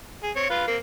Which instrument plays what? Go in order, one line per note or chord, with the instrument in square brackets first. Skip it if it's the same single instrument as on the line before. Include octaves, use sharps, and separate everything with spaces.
[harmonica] G#4
C4 C#5
F4 B4 F5
A#3 C4